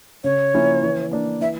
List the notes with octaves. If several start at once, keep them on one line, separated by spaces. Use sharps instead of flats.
C#3 C#5
F3 A#3 C#4 E4
E3
A#3 D4
E3 E5